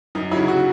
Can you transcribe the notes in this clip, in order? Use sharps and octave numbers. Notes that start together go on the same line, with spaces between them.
F#2 D#4
C#3 F#3 E4
F#4